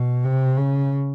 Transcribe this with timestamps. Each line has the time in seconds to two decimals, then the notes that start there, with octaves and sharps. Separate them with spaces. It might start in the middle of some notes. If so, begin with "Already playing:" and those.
Already playing: B2
0.24 C3
0.57 C#3